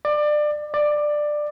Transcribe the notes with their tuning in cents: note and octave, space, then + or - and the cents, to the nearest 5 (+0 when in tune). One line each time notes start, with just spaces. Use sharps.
D5 +25
D5 +15